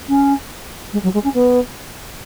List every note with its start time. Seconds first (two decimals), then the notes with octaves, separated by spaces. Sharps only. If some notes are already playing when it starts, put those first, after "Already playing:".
0.08 C#4
0.92 G#3
1.02 F#3
1.13 G#3
1.23 C#4
1.34 B3